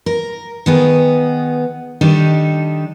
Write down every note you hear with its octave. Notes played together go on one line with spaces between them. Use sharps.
A#4
D#3 B3 G#4
D#3 G3 D4 D#4 A4